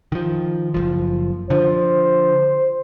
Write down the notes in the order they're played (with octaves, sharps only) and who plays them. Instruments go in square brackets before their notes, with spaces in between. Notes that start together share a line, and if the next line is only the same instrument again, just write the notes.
[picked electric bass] D#3 F3
F#1 C#2 F3
[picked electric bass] D3 F3 [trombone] C5